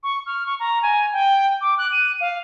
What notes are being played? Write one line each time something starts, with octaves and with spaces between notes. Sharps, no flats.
C#6
F6
C#6
A#5
G#5
G5
D6
F#6
D#7
F5